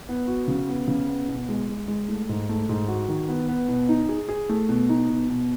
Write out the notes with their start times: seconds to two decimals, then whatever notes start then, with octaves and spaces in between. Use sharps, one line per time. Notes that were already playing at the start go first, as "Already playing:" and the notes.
0.09 B3
0.28 F#4
0.48 C#3
0.69 B3
0.88 C#3
1.09 B3
1.28 B2
1.49 G#3
1.69 G#3
1.88 G#3
2.08 A3
2.29 G#2
2.49 A3
2.69 G#2
2.88 F#4
3.08 D#3
3.29 B3
3.49 B3
3.68 B2
3.89 D#4
4.09 G#4
4.29 G#4
4.49 A3
4.69 B2
4.89 D#4
5.10 B2
5.30 B2